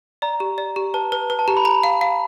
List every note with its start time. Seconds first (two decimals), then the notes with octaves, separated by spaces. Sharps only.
0.22 D5 A#5
0.40 G4
0.58 D5
0.76 G4
0.94 B4 A5
1.12 B4
1.30 B4
1.39 A5
1.48 G4 A#5
1.57 B5
1.65 A#5
1.83 F5
2.01 F5